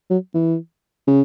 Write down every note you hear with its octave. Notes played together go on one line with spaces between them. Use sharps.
F#3
E3
C#3